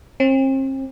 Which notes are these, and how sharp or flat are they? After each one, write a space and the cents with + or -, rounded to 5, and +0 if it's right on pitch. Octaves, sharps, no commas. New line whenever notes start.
C4 +40